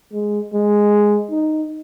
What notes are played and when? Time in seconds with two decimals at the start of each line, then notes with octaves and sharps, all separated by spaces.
0.12 G#3
0.53 G#3
1.31 D#4